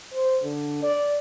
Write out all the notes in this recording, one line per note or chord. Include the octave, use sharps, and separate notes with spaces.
C5
D3
D5